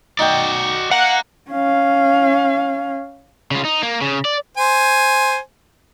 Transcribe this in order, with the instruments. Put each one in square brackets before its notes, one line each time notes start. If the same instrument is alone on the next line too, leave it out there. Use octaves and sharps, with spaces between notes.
[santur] D#4 G5 [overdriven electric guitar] F#4 D5
[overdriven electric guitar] F5 A#5 [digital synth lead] F#5
[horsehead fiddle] C#4 F5
[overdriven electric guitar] C#3 F4
D#4
A#3
C#3
D5
[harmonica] C5 G#5